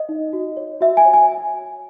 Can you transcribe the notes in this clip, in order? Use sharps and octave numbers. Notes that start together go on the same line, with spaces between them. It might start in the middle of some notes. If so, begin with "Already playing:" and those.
Already playing: D#5
D#4
F#4
C#5
F#4 E5
G#5
C#5
G#5